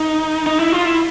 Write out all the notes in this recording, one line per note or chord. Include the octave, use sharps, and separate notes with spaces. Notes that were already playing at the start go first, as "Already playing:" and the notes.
Already playing: D#4
D#4
E4
F4
E4